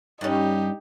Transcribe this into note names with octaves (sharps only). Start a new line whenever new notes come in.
G2 C#4 D#4 G4